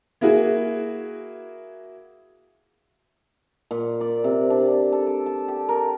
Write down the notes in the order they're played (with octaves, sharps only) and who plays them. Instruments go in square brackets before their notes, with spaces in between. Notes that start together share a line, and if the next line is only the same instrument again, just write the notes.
[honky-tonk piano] A#3 E4 F#4 G#4
[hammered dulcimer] A#2
D5
C3
D4
A4
D6
A5
G4
A#4